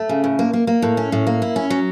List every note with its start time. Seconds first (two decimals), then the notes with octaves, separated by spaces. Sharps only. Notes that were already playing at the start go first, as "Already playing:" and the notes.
Already playing: A3
0.09 C#3
0.24 A2
0.39 A#3
0.53 A#3
0.67 A#3
0.82 A2
0.97 C#4
1.12 A2
1.27 A#3
1.42 E4
1.56 C#4
1.70 F#3